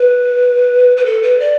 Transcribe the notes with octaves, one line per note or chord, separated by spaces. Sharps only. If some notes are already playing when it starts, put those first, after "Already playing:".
Already playing: B4
B4
A4
B4
D5